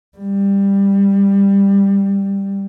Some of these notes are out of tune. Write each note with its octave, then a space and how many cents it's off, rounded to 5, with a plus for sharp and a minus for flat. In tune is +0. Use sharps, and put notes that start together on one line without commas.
G3 +15